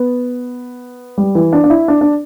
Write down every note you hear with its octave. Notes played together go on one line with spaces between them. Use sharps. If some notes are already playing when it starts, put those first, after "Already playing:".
Already playing: B3
G3
E3
D4
D4
E4
D4
D4